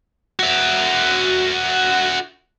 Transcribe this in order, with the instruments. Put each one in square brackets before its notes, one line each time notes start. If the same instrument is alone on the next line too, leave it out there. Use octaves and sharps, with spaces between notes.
[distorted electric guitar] F#4 E5